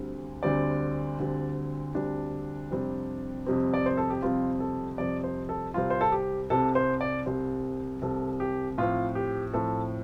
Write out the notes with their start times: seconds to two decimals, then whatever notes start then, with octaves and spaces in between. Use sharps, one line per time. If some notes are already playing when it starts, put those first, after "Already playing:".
Already playing: D2 D3 G3 C4
0.43 D2 D3 G3 C4 D5
1.19 D2 D3 G3 C4
1.95 D2 D3 G3 C4 D4
2.71 F2 C3 G3 C4
3.47 F2 C3 G3 C4
3.74 D5
3.86 C5
3.97 A4
4.10 G4
4.22 F2 C3 G3 C4 F4
4.60 A4
4.98 F2 C3 G3 C4 D5
5.24 C5
5.49 A4
5.74 C2 C3 G3 C4 F4
5.90 C5
6.01 A4
6.12 G4
6.50 C2 C3 G3 C4 A4
6.75 C5
7.01 D5
7.26 C2 C3 G3 C4 C5
8.02 C2 C3 G3 C4 A4
8.40 G4
8.78 A2 F3 C4 F4
9.15 G4
9.54 A2 F3 C4 A4